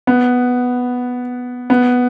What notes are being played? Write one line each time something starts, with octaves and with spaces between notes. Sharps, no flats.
B3
B3